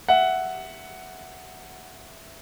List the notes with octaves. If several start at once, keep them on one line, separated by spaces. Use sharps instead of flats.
E5 F#5